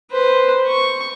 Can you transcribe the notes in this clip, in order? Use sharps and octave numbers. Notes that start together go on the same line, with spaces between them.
B4 C5
C#6